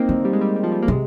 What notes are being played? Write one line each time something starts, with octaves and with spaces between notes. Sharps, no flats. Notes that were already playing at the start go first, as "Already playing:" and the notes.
Already playing: A#3 C4 D#4
D3
G3
G#3
G3
G3
F3
G3
A#3
C3 G#3